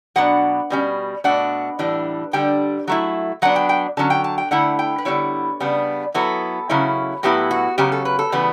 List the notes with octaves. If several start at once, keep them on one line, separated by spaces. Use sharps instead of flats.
B2 F#3 B3 D4 F#5
B2 G3 C#4
B2 A3 D4 F#5
A2 E3 G3 D4
D3 G3 D4 G5
F#3 A3 E4
F#3 B3 D4 F#5
G5
G5
D3 F#3 C#4 A5
G5
A5
G5
D3 A3 E4 F#5
G5
B4
D3 G3 B3 E4 C#5
C#3 G3 B3 D4
F#3 B3 E4 A4
C#3 F#3 C#4 E4
A2 F#3 B3 E4 G4
F#4
C#3 F#3 C#4 G4
A4
B4
A4
C#3 E3 G3 B3 B4